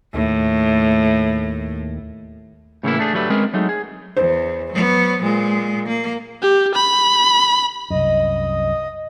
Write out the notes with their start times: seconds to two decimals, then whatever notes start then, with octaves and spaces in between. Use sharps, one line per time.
0.14 D#2 A2
2.83 A2 C#3 E3 A3 A#3 E4
2.99 A3 D4 G#4
3.13 G2 F#3 G3 A3 B4
3.30 G#3 C4 C#4 G#4 A#4 B4
3.53 F#3 G#3 A3 D#4
3.69 G#4
4.17 E2 C5
4.73 F#3 B3
5.23 A#2 G#3
5.87 A#3
6.42 G4
6.75 B5
7.90 C2 F#2 D#5